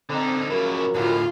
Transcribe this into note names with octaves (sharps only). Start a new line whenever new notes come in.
D3 C4 D#4
C#3 F3 F#3 E4 A#4
D2 A2 F4